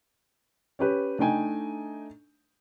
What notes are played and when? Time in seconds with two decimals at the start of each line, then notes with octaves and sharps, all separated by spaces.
0.79 C#4 G4 B4
1.19 A3 D4 D#4 G5 G#5